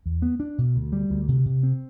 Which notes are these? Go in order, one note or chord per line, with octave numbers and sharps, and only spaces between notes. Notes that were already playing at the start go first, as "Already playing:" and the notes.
E2
B3
D4
B2
D2
G3
D2
C3
C3
C4